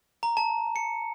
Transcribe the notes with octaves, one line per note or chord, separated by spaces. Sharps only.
A#5
A5
C#7